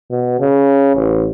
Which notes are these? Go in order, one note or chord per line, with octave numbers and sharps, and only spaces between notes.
B2
C#3
A1